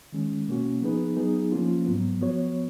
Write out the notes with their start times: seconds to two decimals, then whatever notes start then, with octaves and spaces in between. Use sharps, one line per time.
0.12 D#3 G#3 C#4
0.47 B2 A#3 C#4 F#4
0.82 F3 B3 D#4 G#4 B4
1.16 F#3 B3 D#4 G#4
1.52 F3 A#3 C#4 F4
1.86 G#2 F#3 B3
2.21 F3 B3 F#4 C#5